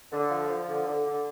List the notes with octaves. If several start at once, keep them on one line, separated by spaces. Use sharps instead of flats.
D3
F3
F3
D3
D3
D3